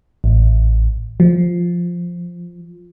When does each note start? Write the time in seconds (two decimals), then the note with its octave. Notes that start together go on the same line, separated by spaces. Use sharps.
0.24 A1
1.20 F3